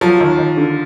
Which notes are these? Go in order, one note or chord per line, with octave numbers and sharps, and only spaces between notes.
F3 F#3
D#2
D#2
D3